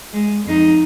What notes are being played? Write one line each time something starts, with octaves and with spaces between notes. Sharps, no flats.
G#3
F2 D#4